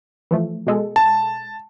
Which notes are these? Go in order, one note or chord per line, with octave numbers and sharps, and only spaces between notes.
E3 F3 A3
B2 G#3 A4
A5